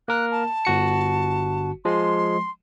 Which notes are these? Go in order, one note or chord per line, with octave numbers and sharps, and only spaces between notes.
A#3 A#4 F#6
A5
G1 F#4 C#7
F3 G#3 C6